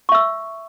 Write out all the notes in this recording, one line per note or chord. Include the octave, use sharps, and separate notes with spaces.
E5 C#6 E6